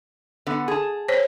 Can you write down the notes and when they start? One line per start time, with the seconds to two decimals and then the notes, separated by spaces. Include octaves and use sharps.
0.47 D3 B3
0.68 G#4 A5
1.08 C5 C#5